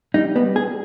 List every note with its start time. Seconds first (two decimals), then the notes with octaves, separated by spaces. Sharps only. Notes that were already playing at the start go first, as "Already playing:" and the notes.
0.14 G3 D#4
0.36 B3
0.46 G3
0.56 G#4